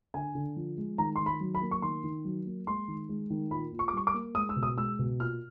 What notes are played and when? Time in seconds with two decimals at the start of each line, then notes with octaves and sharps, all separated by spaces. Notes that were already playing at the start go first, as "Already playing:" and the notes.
0.14 D3 G#5
0.35 D3
0.56 F3
0.77 G#3
0.98 D#3 A#5
1.16 D#3 C6
1.26 B5
1.40 F#3
1.55 B5
1.62 A#3
1.71 C#6
1.82 D#3 C6
2.04 D#3
2.25 F#3
2.46 A#3
2.67 G#3 C6
2.88 D#3
3.09 G#3
3.30 D#3
3.51 A#2 B5
3.72 A#2
3.79 C#6
3.88 D6
3.93 G3 C#6
4.07 D6
4.14 A#3
4.35 G#3 D#6
4.49 E6
4.56 B2
4.63 D#6
4.77 G#3 E6
4.99 B2
5.20 A#2 F6